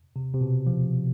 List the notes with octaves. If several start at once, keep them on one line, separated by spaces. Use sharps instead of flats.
C3
C3
B2
F3